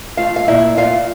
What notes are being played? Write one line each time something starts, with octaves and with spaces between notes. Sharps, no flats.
A3 F4 F5
F5
A#2 E4 E5
A#2 F4 F5